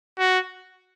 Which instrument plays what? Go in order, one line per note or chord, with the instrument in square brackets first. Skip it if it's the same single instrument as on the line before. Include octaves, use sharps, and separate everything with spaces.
[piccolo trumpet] F#4